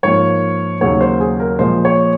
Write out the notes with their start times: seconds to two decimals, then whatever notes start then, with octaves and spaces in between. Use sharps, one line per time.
0.03 G#2 F3 A#3 C#5
0.81 D#2 C#3 F#3 A#3 C#5
1.01 C5
1.20 G#4
1.40 A#4
1.59 A#2 F3 G#3 C5
1.85 C#5